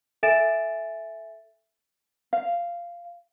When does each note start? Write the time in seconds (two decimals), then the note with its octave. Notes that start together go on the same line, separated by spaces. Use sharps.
0.23 A4 E5 G#5 A6 D7 E7
2.33 F5